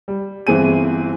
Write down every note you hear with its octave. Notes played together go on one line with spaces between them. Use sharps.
G3
G1 E3 C4 G#4 D#7